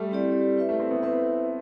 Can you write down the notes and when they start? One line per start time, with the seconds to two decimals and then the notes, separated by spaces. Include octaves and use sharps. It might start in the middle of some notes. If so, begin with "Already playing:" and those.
Already playing: G3 A3
0.11 C4 E4 G4 D5
0.57 E4 B4 E5
0.69 A3
0.80 C4
0.91 B3
1.03 C4 E4 B4 E5